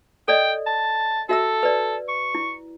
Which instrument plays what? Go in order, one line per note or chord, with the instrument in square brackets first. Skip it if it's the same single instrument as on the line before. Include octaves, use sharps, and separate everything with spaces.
[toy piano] A4 D5 D#5 [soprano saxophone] G5
[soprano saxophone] A5
[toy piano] F#4 E5 E6 [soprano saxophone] A4
[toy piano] B4 D5
[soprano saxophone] C#6
[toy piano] E4